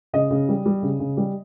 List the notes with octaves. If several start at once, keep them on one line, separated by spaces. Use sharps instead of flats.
C#3 D#5
C#3
G3
G3
C#3
C#3
G3